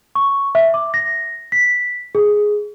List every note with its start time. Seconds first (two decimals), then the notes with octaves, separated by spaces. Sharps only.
0.15 C#6
0.55 E5
0.74 D6
0.94 A#6
1.52 B6
2.15 G#4